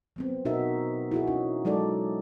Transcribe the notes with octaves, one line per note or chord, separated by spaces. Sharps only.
F#3 B3 C4
B2 D#4 F#4 A#4 E5
E4 F#4 G#4
C#4 D#4
F#3 G#3 D#4 A4 D5